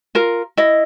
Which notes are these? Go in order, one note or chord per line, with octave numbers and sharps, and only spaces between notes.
F4 A#4
E4 D#5